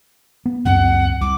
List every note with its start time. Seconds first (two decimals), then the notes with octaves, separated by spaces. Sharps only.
0.46 B3
0.65 C#2 F#2 C4 F#5
1.21 C2 D6